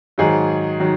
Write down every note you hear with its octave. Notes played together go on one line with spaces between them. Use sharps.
G#2 D#3 F#3 G#4
D#3 F#3